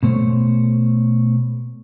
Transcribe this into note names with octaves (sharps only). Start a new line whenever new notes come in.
B2 A3 C5 C#5